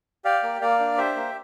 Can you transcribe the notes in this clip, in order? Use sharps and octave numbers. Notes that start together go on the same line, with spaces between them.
G4 D5 F5
A#3
A#3 D5 F5
D4
G4 C5 E5
A#3